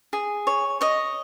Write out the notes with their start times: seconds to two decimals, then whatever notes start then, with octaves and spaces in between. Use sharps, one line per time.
0.13 G#4
0.47 C#5
0.81 C#5 D#5